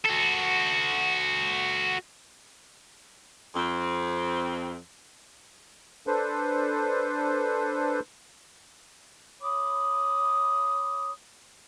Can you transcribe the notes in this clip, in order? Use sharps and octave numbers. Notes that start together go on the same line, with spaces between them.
F#4 A4
F2 C4
D4 A4 B4 C5
C#5 B5 D6 D#6